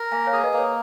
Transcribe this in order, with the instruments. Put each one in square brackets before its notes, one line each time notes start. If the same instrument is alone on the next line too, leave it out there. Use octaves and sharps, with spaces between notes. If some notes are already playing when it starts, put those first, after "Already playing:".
Already playing: [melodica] A#4
[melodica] A#3 [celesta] F5 G#5
[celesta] C#5 F5
[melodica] G#4
[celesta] B4 D#5
[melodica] A#3
[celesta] C#5